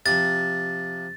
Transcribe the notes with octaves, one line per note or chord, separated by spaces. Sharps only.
C3 F3 A6